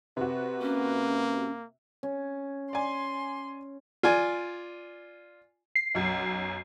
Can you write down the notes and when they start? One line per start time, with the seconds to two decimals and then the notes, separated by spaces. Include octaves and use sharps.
0.17 C3 F#4 B4
0.62 A#3 C#4
2.03 C#4
2.73 D5 G#5 C6
4.03 F4 D5 G#5
5.76 C7
5.95 B1 F#2